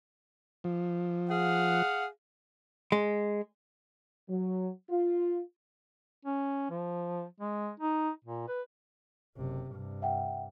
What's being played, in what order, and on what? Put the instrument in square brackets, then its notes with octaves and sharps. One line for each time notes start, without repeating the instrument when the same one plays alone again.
[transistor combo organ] F3
[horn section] G#4 F5 F#5
[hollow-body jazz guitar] G#3
[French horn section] F#3
F4
[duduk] C#4
F3
G#3
D#4
A#2
B4
[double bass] F#1 C3
G2 C3
[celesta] E5 F#5 G5